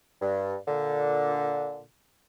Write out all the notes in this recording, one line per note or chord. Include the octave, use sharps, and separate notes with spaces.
G2
A#2 D3